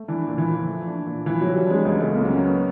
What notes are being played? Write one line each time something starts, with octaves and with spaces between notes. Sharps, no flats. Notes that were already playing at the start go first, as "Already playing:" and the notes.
Already playing: A3
E3 D4
A#2
E3
F3
A3
D4
A#2
E3 F3
F#3 A3
G3
G#3 D4
C#2 G#3
C#3 A3
A#3
F#3 C#4
B3